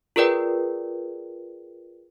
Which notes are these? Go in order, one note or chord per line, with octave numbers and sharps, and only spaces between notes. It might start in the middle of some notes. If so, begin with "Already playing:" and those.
F4 G#4 A#4 B4 D5 G5